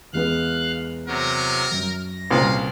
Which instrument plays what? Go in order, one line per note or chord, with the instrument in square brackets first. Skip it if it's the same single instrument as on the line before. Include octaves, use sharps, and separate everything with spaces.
[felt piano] E2 G#3 B3 [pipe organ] F5 F#6
[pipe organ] C3 F#3 [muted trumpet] A#4
[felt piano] F#2 [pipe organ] A#6
[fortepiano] C2 A#2 [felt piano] C#3 B4 D#6 [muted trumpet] F5